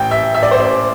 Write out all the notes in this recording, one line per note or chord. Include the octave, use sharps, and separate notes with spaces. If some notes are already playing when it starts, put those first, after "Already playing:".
Already playing: A1 G5
A1 E5
A1 E5
D5
C5
A1 D5